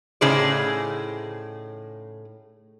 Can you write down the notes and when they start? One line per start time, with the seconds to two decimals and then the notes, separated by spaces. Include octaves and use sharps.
0.21 A2 C#3 D#4 G#4 C5 D5